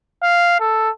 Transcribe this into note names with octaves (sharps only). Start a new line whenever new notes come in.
F5
A4